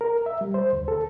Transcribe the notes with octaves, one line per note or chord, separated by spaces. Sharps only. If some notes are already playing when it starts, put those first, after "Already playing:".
A#4
E5
G3
C5
D2
A4